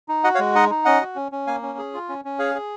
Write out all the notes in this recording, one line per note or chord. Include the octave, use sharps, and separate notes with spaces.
D#4
F#4 D#5 F#5
C#5 F5
G#3
D#4 D#5 F#5
D#4
C#4 D#5 F#5
F#4
C#4
C#4
A#3 F5 G#5
C#4
G#4
F4
C#4
C#4
G#4 C#5 F5
G#4